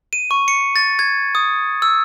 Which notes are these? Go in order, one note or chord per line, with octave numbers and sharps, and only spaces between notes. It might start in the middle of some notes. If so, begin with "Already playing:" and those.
D#7
C#6
C#7
A6
G#6
D#6
E6